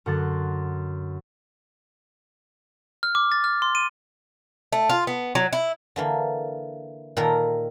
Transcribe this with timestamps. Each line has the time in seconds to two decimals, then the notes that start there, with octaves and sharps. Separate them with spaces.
0.06 F#2 D3 F#3 F#5 C6 A6
3.03 F6
3.15 D6
3.32 A6
3.44 F6
3.62 C6
3.75 D#7
4.72 A3
4.90 F4
5.07 B3
5.35 F#3
5.53 E4
5.96 D3 E3 A#3
7.17 A#2 D#3 A4 A#4 G5 A#5